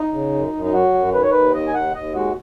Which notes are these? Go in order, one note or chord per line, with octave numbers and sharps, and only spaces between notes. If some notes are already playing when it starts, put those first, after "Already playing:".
Already playing: D#4
C#3
F#2
F#2
D#4
F#3 F#4
F#2
D#3 B4
C#5
D#2 B4
D#3 D#5
G#5
D#2 F#5
D#2 D#5
G#3 F#4